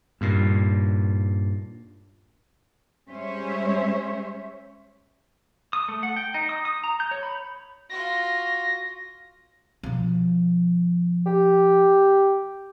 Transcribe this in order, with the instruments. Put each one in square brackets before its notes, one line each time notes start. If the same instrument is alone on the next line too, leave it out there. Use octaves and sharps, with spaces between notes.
[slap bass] G2 A#2
[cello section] G3 G#3 C#4 C5 C#5 E5
[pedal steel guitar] D#6
A3
F#5
G5
D#4
D#6
D#6
A#5
G6
C#5
B5
[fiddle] F4 F#4 [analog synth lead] A#6
[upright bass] B2 F3
[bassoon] G4